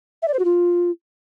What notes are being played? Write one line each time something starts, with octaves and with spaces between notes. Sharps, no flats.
E5
D5
C5
F#4
F4